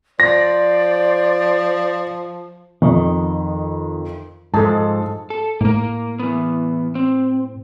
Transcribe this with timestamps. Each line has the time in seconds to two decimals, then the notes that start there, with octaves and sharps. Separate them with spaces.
0.20 F3 C5 D5 A#6
2.82 F2 D#3
4.54 G#2 F3 G#3 A4 A5
5.30 A4
5.61 A2 A#3 A#4
6.19 E3 B3
6.95 C4